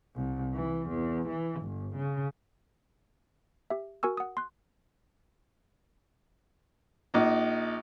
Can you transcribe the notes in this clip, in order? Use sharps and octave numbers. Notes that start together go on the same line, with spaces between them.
C2
E3
E2
E3
G1
C#3
G4 E5
F#4 A#4 G#5 C#6 E6
F#5 D#6
C6 F#6
A#1 D#4